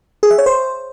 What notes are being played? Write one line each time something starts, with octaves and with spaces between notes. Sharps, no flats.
G#4
E5
C#5
C5